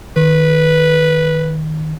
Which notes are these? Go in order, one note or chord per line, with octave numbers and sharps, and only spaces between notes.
D#3 B4